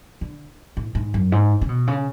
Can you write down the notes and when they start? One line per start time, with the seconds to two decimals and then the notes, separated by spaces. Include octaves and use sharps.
0.21 D3
0.77 A2
0.95 G#2
1.14 F#2
1.32 G#2
1.62 C#3
1.69 B2
1.87 C#3